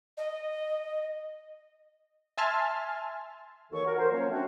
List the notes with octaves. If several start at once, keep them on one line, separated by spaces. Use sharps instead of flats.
D#5
E5 G#5 A5 C6 F6
D#2 E3 A4 C#5 C#6
F#4 A#4
A#4 C5
F3 F#3 A#3 C#4 C#5
A3 C4 D4 F#4